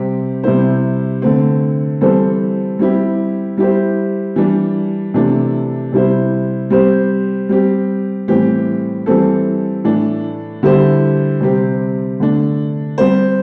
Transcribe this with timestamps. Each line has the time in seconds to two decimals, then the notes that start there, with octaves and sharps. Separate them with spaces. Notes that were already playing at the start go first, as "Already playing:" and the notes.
Already playing: C3 G3 C4 G4
0.43 C3 G3 E4 C5
1.22 D3 A3 C4
2.01 E3 G3 C4 A4 C5
2.79 G3 C4 E4 G4
3.58 G3 E4 G4 C5
4.36 E3 G3 D4
5.14 C3 E3 A3 D4
5.93 C3 G3 E4 C5
6.70 G3 C4 G4 C5
7.49 G3 C4 G4
8.28 A2 E3 G3 C4 G4
9.06 E3 G3 C4 A4
9.84 A2 E3 A3 D4
10.63 D3 G3 E4 G4 C5
11.41 C3 G3 C4 G4
12.20 D3 A3 D4
12.98 G3 C4 G4 C5